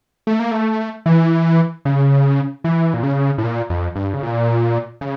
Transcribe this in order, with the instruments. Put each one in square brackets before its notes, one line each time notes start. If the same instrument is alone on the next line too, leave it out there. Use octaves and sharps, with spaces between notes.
[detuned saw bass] A3
A#3
A3
E3
C#3
E3
A#2
C#3
A2
A#2
F2
G2
C#3
A#2
C#3